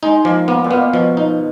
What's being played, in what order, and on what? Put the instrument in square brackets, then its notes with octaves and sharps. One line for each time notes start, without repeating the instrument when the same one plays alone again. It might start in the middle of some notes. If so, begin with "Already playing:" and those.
[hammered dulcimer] G#3 [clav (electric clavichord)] D#4
[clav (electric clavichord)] F3 [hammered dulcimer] A#3
[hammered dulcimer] A#3 [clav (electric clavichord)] B3
[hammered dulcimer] A#2
[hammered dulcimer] B2 [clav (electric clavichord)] B3
[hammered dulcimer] B2 [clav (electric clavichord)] F3
[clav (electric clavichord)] D#4